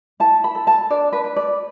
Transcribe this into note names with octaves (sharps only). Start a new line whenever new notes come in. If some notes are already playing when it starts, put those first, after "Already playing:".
E4 A5
B5
A4
A5
D4 D5
B4
B4
D5